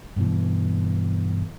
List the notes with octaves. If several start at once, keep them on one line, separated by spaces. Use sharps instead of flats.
G2 B2 E3